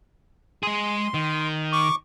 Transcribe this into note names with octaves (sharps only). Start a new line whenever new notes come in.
G#3 G#4 C6
D#3
C#6 D6